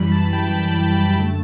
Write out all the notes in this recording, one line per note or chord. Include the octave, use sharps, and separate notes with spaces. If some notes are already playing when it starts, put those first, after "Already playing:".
Already playing: F#2 E3 G3 B5
A5
G5
F#2 D3 A3 A5